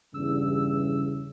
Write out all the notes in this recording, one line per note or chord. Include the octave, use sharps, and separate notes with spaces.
E2 G2 C#3 E6